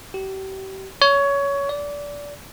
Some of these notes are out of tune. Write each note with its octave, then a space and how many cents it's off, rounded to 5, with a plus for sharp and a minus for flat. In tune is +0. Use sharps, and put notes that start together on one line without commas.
G4 -35
C#5 +20
D5 -20